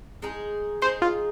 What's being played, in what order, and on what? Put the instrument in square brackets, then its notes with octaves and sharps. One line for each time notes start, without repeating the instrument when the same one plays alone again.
[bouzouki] G#3 D#4 G#4
[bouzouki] G#3 D#4 G#4 [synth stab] C5
[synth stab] F4